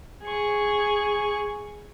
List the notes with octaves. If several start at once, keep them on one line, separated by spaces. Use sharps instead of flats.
G#4 C#6